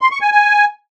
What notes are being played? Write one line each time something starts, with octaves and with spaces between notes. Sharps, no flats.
C6
C#6
G#5
G#5